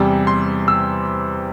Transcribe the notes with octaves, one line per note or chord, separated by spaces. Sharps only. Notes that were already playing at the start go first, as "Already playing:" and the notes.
Already playing: E2 C3 G3 E6
C6
E6